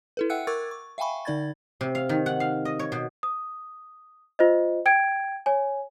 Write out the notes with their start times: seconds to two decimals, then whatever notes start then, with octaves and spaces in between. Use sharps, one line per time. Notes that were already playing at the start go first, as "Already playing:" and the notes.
0.17 E4 A4 B4
0.30 E5 F#5 G5 E6 F#6 C#7
0.47 A#4 C#6 D6 E6 G#6 A6
0.71 C#6
0.98 E5 F5 G5 G#5 B5 C#6
1.25 D3 D#4 D5 B5 G#6 A6
1.81 C3
1.95 F5
2.09 D#3
2.26 F#5
2.40 F5
2.65 D#5
2.79 C#5
2.92 B2
3.23 D#6
4.39 F4 C5 D#5
4.86 G5 G#6 D7
5.46 C#5 G#5